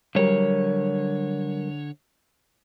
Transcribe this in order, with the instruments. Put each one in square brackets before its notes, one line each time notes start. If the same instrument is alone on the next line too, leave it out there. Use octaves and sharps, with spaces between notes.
[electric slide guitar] D3 C#5 [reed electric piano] F#3 G3 A#4